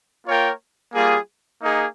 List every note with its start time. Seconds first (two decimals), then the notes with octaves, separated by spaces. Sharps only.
0.27 A#3 F4 A#4 C#5 G5
0.95 G3 A#3 F4 G#4
1.63 A#3 D#4 G#4